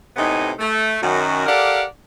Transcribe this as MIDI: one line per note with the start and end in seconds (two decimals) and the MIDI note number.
0.16 0.51 45
0.16 0.51 48
0.16 0.51 59
0.16 0.51 63
0.16 0.51 75
0.16 0.51 80
0.59 0.97 57
1.02 1.45 42
1.02 1.45 51
1.02 1.45 66
1.46 1.84 67
1.46 1.84 69
1.46 1.84 70
1.46 1.84 74
1.46 1.84 77
1.46 1.84 78